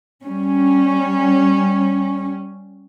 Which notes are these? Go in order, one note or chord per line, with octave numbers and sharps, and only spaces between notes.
G3 C#4